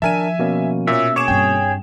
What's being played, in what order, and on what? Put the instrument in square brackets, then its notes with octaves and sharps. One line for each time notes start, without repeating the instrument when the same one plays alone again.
[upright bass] D#3 F3 [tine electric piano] D4 A#4 A5 [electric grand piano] E5 G#5 D#7
[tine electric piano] B2 A#3 C#4
[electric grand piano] A#2 C#5 [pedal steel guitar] E5
[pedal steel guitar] G#4 C#5 [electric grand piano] C#6 D6 E7
[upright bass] G2 C4 [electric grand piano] G5